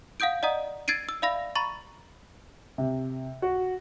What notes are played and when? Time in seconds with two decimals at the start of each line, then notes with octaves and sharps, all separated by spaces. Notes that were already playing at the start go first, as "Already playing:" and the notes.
0.20 F5 F#5 D#6 G6 D7
0.43 D5 D#5 F#5 A#5 D#6
0.88 E6 G#6 A6 C7 D7 D#7
1.09 E6
1.22 D5 E5 F5 B5 E6 A#6
1.55 A#5 B5 C#6 A6
2.78 C3
3.42 F#4